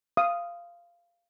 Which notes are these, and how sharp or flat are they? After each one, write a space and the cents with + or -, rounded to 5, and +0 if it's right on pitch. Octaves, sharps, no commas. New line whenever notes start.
F5 -10 D#6 +0